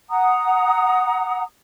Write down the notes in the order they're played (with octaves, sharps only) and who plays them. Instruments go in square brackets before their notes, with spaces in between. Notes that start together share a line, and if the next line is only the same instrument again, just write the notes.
[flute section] F#5 A#5 D#6